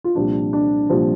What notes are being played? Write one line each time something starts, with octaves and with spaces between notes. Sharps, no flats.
F4
C2 A#2 F3 D4
D4
C2 A#2 F3